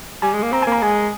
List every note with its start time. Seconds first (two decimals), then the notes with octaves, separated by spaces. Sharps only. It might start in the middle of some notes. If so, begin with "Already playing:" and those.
0.22 G3 G#5
0.33 G#3
0.43 A#3
0.52 C4 A#5
0.62 A#3 G#5
0.72 A#5
0.82 G#3 G#5